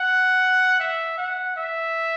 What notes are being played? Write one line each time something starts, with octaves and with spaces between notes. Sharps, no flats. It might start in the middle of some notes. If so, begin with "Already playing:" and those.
Already playing: F#5
E5
F#5
E5